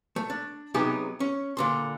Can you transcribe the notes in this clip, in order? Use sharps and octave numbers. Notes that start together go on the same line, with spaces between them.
A3
D4
C3 F#3 B3 D#4 G4 G#4
C#4
A#2 D3 C6